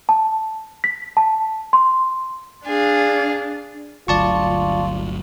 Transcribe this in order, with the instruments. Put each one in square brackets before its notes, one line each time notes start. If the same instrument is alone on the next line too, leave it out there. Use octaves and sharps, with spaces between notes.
[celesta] A5
B6
A5
C6
[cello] D4 [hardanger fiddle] G#4 F5
[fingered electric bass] G1 D2 F#3 [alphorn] F4 [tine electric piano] D5 A5 C#6